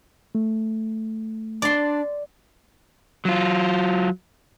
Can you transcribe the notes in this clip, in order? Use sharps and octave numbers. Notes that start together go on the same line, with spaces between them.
A3
D4 D5 C6
F#3 F4